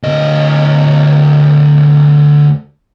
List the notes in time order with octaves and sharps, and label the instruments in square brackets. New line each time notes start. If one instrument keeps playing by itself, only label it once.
[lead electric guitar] D2 D#5